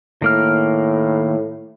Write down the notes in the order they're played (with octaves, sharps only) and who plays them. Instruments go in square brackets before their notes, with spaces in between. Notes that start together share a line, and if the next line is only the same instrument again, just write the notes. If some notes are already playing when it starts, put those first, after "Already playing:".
[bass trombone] A2 [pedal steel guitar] D#3 A#3 F6